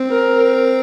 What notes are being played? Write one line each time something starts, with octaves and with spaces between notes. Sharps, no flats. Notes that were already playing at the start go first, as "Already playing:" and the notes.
Already playing: C4
A#4